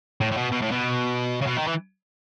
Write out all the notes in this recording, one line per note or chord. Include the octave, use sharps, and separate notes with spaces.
A2
A2
B2
B2
A2
B2
C#3
B2
D#3
E3